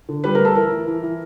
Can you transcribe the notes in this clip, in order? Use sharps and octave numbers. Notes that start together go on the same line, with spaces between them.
D3
G3 B4
D2 A#4
A4
E3 A#4
E3
E3
E3